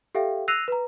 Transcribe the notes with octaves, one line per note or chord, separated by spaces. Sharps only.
G4 A4 E5 F5 G5
E6 F#6 A#6 C7 D#7 F7
B4 A#5